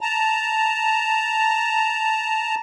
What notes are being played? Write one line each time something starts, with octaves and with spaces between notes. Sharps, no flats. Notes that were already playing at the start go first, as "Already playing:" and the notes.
A5 A#5